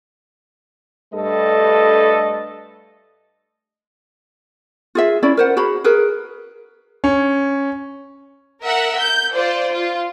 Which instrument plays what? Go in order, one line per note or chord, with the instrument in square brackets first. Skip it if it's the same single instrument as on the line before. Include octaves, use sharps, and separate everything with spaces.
[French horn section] G2 G3 A3 A4 B4 D#5
[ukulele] F4 G#4 E5
C#4 E4 D5 B5
A#4 C5 F#5
F#4 G#4 B5
G#4 A#4 B4
[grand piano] C#4
[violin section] A#4 E5 F#5
G6
F4 C5 D5
F4